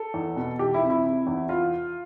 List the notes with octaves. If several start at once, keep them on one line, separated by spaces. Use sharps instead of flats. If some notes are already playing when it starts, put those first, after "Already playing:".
Already playing: A4
E2
B2
E3 G4
E4
C3
E4
C3
E2
F4